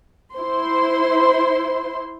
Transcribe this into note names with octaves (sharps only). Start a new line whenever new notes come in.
E4 C5 C6